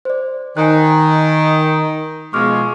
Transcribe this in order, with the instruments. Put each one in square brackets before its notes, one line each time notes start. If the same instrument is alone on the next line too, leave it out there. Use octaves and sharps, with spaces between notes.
[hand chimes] C5 D5
[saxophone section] D#3 [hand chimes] G#5 A#5 F#6
[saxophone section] B2 F3 G#3 [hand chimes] C#6 D6 F6